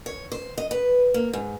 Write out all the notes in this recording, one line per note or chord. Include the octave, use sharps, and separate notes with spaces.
C#5
C5
D#5
B4
A#3
G#2